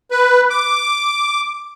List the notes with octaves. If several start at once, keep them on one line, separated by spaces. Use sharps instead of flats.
B4
D6